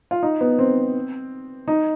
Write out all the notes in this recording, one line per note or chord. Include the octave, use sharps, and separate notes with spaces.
F4
D#4
B3
C4
D#4